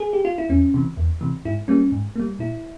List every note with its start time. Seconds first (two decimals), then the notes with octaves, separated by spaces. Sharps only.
0.00 G#4
0.13 G4
0.25 F4
0.38 E4
0.49 E2 C#4
0.74 C3 E3
0.97 E2
1.21 C3 E3
1.45 G#2 E4
1.68 G3 A#3 C#4
1.92 G#2
2.16 G3 A#3
2.39 A#2 E4